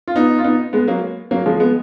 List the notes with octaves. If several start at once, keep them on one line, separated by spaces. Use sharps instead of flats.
F4
B3 D#4
F4
B3 D#4
G#3 B3
F#3 A#3
F#3 A#3
F3 G#3
G#3 B3